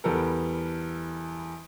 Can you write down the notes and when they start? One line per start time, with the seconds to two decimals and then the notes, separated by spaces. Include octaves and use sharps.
0.04 E2 G3 B3 A4 A#4